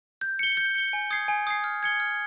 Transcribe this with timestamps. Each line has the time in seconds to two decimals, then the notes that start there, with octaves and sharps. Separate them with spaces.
0.21 G6
0.39 C#7 G7
0.57 G6
0.75 C#7 G7
0.93 G#5
1.11 D#6 G#6 C7
1.28 G#5
1.47 D#6 G#6 C7
1.64 F6
1.83 G#6 C#7 G7
2.00 F6